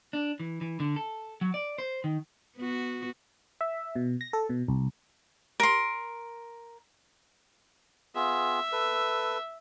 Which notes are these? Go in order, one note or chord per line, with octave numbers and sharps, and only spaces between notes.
D4
E3
E3
D3
A4
F#3
D5
C5
D#3
B3 F#4
E5
B2
A#6
A4
B2
C2
A#4 C6
B3 F4 G#4 E5
A4 B4